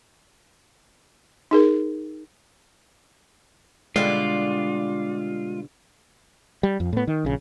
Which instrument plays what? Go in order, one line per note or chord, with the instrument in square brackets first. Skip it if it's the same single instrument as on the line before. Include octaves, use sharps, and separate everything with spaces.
[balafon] D#4 G#4 A#4
[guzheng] B2 D3 G3 [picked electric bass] G#3 [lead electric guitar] F4 [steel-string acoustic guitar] D5
[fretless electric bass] G3
F2
A2 B3
D#3
A#1 C#3